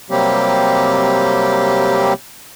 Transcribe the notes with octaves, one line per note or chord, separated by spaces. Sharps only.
C3 F#3 G3 A#3 C4 G4